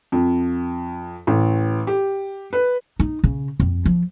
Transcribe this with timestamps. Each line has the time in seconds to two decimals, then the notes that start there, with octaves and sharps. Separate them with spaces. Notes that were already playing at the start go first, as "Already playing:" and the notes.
0.12 F2
1.27 A1
1.87 G4
2.53 B4
2.99 D#4
3.24 C#3
3.60 F2
3.85 F3